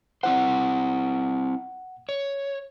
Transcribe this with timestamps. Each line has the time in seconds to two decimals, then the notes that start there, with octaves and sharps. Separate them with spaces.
0.23 C4 E4 C5 F#5
2.09 C#5